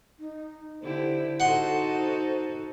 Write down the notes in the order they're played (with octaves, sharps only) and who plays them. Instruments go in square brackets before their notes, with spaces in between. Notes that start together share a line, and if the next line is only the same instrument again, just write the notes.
[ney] D#4
[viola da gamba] D3 E4 G4 [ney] C5
[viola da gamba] D#4 F#4 A4 [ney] C5 [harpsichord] F#5 C6